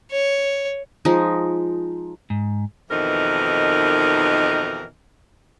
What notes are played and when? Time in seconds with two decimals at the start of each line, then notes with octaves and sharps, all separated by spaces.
0.11 C#5
1.05 F3 G#3 D#4
2.30 G#2
2.91 F2 B2 D#3 E3 D#4 A#4